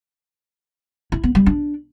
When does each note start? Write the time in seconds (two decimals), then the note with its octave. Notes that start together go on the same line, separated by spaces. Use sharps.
1.12 E4
1.23 B3
1.35 G3
1.46 D4